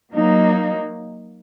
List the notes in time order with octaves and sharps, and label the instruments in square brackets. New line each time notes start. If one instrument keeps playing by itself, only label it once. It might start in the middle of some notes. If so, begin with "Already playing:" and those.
[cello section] F#3 A#3 D#4